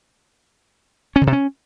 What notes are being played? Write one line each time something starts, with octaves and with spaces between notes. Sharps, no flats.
C#4
D3
C3
C#4